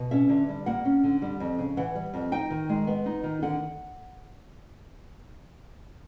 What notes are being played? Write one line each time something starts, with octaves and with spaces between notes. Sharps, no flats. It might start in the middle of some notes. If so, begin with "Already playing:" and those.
Already playing: B2
C#4 E5
D3
G3
A#3 F#5
C#4
D3
G3
F2
C#3
E3 F#5
G3
F2
D#4 G5
D#3
G#3
B3
D#4
D#3
D3 F#5